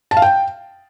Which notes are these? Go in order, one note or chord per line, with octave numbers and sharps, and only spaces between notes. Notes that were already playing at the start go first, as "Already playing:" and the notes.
A5
F5
G5